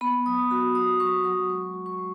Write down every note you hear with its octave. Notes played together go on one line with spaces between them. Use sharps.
B3 B5
F#3 D#6
F#4 B5
F#3 D#6
F#3 C#6
F#3 C#6
G#3 C#6
F#4
C#6
G#3